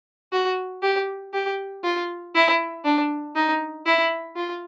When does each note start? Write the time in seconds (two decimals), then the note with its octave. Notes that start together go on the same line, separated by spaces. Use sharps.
0.33 F#4
0.82 G4
1.33 G4
1.84 F4
2.35 E4
2.84 D4
3.35 D#4
3.86 E4
4.36 F4